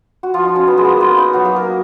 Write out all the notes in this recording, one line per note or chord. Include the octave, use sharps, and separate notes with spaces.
F#4
F3 F4
D#4
C#4
B3
G#3
A#3 B3
B3
D#4
F#3 F#4
A#3 A#4
A#3 A#4